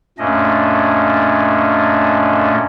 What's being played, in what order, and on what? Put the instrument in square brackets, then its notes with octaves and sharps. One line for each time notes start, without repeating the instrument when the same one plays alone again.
[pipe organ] F#2 A#2 A3 C#4 D4 D#5